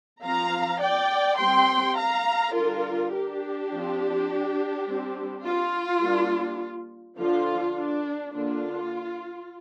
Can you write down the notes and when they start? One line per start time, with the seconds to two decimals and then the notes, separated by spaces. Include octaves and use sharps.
0.24 F3 C4 F5 A#5
0.81 D5 G5
1.39 G3 C4 G5 C6
1.97 F5 A#5
2.55 D3 G3 D4 F4 A#4
3.13 D4 G4
3.71 F3 C4
4.87 G3 C4
5.44 F4
6.02 G3 A#3 D4
7.17 D3 F3 D4 F4
7.75 D4
8.33 D3 A#3 D4 F4